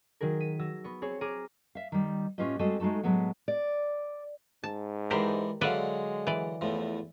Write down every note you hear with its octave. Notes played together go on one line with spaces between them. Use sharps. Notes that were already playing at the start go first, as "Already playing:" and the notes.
D#3 F#3 G#4 A#4
B6 D#7
F#3 E6 A#6
B3 C#6
C4 G#4 C#5
G#4 A#5 D6 F6 D#7
E5 F5
D#3 G3
A2 C#4 F4 G4 B4 D#5
G3 G#3 C4 F#4 A4 D#5
G#3 A3 D#4 F#4 A4
A2 F#3 G#3 B3 F#5
D5
G#2 A5
E3 G#3 D4 G4 A#4 C5
D3 F#3 G#3 B4 D5 E5 F5
E3 D5
E2 A2 F3